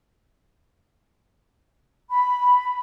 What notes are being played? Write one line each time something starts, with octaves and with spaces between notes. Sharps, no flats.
B5